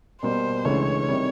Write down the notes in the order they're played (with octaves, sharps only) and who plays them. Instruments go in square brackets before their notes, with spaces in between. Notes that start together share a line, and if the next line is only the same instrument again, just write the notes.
[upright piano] B2 G3 A#3 [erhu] C5
[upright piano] C#2 C#3 E3 A3 D4 [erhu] C#5
[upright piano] C3 D#3 G3 C4